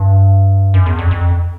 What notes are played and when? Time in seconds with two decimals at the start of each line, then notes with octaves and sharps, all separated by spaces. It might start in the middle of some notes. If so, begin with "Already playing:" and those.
Already playing: G2
0.74 F#2
0.86 E2
0.99 F2
1.11 F2